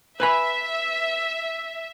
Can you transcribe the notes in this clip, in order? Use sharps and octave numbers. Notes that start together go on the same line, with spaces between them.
B4 E5 G#5 B5